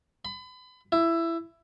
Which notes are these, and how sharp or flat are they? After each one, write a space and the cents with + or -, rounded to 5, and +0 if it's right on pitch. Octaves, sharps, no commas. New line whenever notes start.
B5 +35
E4 +15